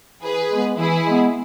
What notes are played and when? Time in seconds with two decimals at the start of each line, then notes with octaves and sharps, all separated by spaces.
0.22 E3 G#4 B4
0.51 G#3 B3
0.78 E3 E4 G#4
1.06 G#3 B3